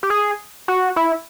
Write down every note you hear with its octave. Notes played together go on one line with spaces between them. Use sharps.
G4
G#4
F#4
E4